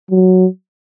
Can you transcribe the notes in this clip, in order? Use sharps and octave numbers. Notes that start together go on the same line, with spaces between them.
F#3